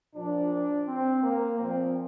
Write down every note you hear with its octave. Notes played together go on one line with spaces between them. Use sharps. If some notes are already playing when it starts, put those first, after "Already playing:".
A#2 F3 D4
C4
A#3
A#2 F3 C4